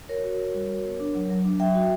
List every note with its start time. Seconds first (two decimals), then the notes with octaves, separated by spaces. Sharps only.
0.09 F#4 A#4 C#5
0.24 F#4
0.40 F#4
0.54 G3
0.69 F#4
0.84 B3
1.00 D4
1.15 F#3
1.30 F#3
1.45 D4
1.60 F#3 E5 G5
1.75 F#4